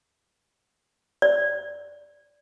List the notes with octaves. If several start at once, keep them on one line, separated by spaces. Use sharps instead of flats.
D5